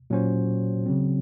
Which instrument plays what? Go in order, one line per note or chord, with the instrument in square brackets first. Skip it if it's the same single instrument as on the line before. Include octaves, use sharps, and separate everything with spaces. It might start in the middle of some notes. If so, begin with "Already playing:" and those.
[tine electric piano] A#2 F#3 C#4 F#4 C5
C#3 F#3 C4